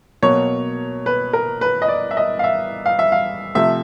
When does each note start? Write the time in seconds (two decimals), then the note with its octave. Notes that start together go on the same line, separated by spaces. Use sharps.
0.22 B2 F#3 A#3 C#5
1.06 B4
1.33 A#4
1.61 B4
1.82 D#5
1.88 D5
2.11 E5
2.17 D#5
2.39 F5
2.44 E5
2.86 F5
2.99 E5
3.12 F5
3.55 C3 F3 A3 E5